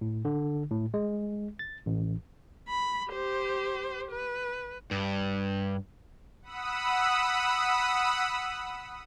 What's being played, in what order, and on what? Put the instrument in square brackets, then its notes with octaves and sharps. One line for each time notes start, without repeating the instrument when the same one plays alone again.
[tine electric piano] A2
D3
A2
G#3
A6
A1
[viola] B5
G4 C5
B4
[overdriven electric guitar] G2
[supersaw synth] F#5 B5 D#6 E6